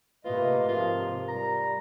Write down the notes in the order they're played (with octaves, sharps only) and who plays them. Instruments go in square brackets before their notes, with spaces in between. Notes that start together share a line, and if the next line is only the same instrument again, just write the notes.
[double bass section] G#2 C3 [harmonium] A3 A#3 D#5 [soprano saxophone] F4 [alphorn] B4
[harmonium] F3 [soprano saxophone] F4 [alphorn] A#4
[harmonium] G3 [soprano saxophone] A#5